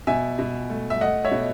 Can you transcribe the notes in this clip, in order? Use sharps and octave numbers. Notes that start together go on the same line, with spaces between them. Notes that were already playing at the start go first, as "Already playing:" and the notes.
B2 E5 G#5
B2
A3
E5
A3 D#5 F#5
C#5 E5
B2